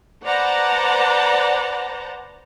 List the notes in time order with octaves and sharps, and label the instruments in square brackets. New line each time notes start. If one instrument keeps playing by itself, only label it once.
[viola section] B4 C5 D5 F#5 A5 A#5